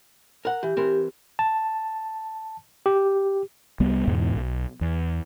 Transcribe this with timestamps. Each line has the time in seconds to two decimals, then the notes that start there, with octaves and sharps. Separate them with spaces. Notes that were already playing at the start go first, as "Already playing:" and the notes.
0.45 A#4 F#5
0.63 E3 G4
0.77 E3 C4 A#4
1.39 A5
2.86 G4
3.80 C2 G3 B3
4.07 E2 G#2 B2 E3
4.35 B1
4.81 E2